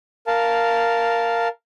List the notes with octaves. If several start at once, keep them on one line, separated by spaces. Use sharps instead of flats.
A#4 F5 A5